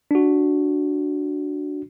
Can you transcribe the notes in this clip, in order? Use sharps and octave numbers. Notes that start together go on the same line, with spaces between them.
D4 F#4